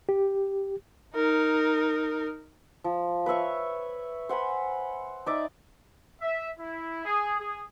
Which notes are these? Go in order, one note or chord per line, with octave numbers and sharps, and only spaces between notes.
G4
D#4 A#4
F3
B4 C#5 E5 C#6
C5 F#5 G#5 B5
D#4 D5 E5
E5
E4
G#4
G#4